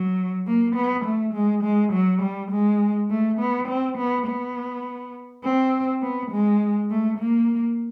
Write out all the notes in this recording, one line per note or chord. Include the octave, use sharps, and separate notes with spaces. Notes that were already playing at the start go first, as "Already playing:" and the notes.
Already playing: F#3
A#3
B3
A3
G#3
G#3
F#3
G3
G#3
A3
B3
C4
B3
B3
C4
B3
G#3
A3
A#3